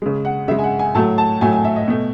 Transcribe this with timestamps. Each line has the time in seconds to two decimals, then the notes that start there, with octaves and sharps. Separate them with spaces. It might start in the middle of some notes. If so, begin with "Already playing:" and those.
0.02 C#3 G#3
0.25 F#5
0.48 C#3 E5
0.51 G#3
0.59 G#5
0.64 F#5
0.79 G#5
0.95 A2 F#3 A3 A5
1.18 A5
1.41 A2 F#3 A3 G#5
1.53 G#5
1.64 E5
1.76 D#5
1.88 B2 A3